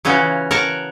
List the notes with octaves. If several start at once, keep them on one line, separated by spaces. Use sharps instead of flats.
C#3 E3 C#4 F4 F#4
A#4 C#5 F#5 A5 A#5